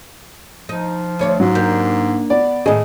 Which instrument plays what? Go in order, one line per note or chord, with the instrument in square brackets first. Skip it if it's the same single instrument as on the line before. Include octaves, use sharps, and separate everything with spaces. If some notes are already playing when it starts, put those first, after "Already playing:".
[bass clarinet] F3 [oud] D#4
[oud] D2 C#5 D5
[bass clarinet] G#2 [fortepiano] F#3
[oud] A#3 D4 G4
[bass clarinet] B3 [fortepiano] D5
[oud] A2 D#3 [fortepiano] G#4 D#5